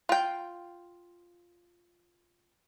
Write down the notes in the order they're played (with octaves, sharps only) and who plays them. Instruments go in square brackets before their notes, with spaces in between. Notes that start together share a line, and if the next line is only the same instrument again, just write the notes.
[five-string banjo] F4 G5